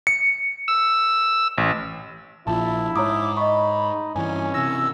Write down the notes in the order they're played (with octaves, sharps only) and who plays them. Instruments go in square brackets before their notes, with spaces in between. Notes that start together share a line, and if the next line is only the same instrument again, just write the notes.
[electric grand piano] C#7
[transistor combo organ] E6
[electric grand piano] A1
[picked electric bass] A#1 A#2 F3 [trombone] E4 [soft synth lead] A5
[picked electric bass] G#2 [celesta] C#5 A#5 D#6 [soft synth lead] D6
[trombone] D#4 [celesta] D#5 C#6 [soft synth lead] B5
[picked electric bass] G2 E3 [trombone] C#4 [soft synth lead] G#5
[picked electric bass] C3 E3 [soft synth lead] E6 [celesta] A#6